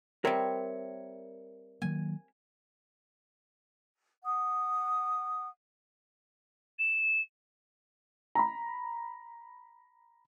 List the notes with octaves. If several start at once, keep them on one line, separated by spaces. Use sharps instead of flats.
G3 C4 A#4 C#5 E5
D#3 F#3 A#3 G#5
F#5 D#6
E7
A#5 B5